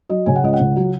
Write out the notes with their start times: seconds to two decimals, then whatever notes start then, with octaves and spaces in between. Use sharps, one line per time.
0.09 F#3 D#5
0.26 C#3 G#5
0.36 F#5
0.43 C#2 D#5
0.53 F#5
0.60 C#3
0.76 F#3